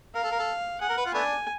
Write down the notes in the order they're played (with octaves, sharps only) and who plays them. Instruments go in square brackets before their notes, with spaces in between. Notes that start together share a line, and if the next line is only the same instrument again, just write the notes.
[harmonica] A#4 [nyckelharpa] F5
[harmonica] A4
A#4
A4
[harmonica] G#4 [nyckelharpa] F#5
[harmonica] A#4
B4
F4
[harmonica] A3 B3 D4 [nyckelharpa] G#5